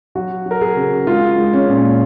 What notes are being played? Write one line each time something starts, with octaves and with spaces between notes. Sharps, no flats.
F#3 F#4
F#3
A#4
G#4
C#3
G#3 F4
G#3
C#4
A#2